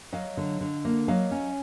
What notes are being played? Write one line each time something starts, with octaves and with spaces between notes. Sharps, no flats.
F#3 D#5 F5
D3
D3
A#3
F#3 D#5 F5
C#4